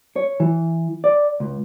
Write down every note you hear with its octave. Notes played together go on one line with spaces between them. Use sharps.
C#5
E3
D5
C#2